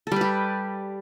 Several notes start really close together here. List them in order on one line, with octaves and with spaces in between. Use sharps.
A4 G3 B4 G4